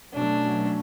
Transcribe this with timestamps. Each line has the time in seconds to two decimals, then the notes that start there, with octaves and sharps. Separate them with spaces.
0.14 B2 F#3 A3 C#4 D4